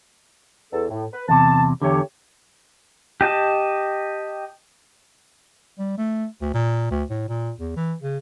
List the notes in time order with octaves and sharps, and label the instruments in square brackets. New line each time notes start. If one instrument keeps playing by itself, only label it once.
[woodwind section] E2 A4
A2
B4
[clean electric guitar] E2 C3 [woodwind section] A5
[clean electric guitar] E2 D3 [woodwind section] A3 G4 C#5
[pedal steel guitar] G4 D#5 A5
[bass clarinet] G3
A3
D2
A#2
D2
A2
A#2
E2
E3
C#3